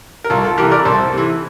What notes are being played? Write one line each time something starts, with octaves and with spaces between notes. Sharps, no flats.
A#4
C2 F4 A4
F4 A4
C3 E3 G4 A#4
A#4 D5
C2 A4 C5
C3 E3